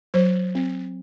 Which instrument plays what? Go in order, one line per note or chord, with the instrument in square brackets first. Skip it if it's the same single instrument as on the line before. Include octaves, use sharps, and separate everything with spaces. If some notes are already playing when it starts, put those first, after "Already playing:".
[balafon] F#3 C5
C4